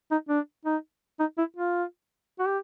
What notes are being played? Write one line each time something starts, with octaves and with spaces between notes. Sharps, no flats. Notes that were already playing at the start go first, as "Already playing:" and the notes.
D#4
D4
D#4
D#4
E4
F4
F#4
G4